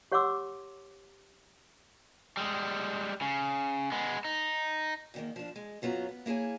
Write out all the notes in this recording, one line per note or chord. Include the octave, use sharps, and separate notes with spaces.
G4 C#5 F#5 C6 D6 E6
G3 G#3
C#3
G#3 B3
D#4
E2 D#3 A#3
F3 D4
G#3
F#2 F#3 B3 F4 A#5
B3
A#3 E4 G#4 C#5 G#5